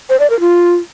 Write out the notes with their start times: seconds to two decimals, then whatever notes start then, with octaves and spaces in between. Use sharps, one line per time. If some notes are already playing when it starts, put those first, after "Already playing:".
0.10 C5
0.20 D5
0.30 A#4
0.40 F4